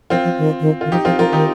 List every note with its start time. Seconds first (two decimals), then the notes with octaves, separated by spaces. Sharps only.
0.10 F3 C4 F4
0.24 F3
0.38 D#3
0.60 D#3
0.81 D#3 F4
0.92 F3 D#4 G4
1.05 F3 C4 F4
1.19 F3 F4 A#4
1.32 D#3 D#4 G4